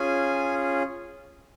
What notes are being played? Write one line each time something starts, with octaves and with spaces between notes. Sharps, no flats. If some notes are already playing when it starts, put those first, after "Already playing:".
Already playing: C#4 F4 G#4 G#5